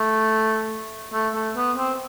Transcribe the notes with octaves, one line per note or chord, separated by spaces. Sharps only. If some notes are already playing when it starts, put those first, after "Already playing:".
Already playing: A3
A3
A3
B3
C4